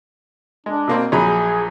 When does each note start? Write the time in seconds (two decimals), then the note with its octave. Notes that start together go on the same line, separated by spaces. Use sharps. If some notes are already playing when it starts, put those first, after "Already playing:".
0.66 G#3 D4
0.88 B2 A#3 C4
1.12 A#1 F#3 G#4 B5